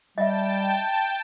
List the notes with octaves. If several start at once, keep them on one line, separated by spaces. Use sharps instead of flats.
G3 D#5 E5 G5 A5